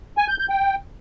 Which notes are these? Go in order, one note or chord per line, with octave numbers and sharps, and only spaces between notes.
G#5
G6
G6
G5